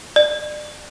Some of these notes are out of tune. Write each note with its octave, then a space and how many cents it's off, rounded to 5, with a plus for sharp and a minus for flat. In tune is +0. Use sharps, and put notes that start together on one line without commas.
D5 +30